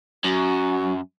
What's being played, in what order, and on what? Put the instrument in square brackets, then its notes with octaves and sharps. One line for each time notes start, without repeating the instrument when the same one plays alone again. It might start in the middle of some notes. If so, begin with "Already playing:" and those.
[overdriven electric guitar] F#2 [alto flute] F#4